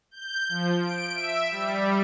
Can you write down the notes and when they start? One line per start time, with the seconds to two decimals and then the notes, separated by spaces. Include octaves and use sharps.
0.11 G6
0.49 F3
0.82 D7
1.14 E5
1.51 G3